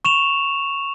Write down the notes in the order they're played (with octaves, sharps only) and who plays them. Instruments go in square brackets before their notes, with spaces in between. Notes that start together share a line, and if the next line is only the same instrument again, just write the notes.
[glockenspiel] C#6 E7 F7